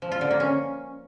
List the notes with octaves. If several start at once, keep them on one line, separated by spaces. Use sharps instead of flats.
F3
F4
D3
A#3
C#4